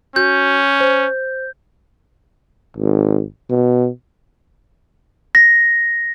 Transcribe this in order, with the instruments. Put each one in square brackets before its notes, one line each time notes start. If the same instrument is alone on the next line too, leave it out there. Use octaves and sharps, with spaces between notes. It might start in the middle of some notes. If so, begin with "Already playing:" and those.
[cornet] C#4 [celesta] F#4 [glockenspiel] G6
[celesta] C5
[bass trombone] G#1
B2
[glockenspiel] A#6